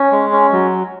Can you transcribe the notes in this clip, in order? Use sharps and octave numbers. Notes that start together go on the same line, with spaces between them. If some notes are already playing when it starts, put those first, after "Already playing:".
Already playing: C#4
G#3
C#4
F#3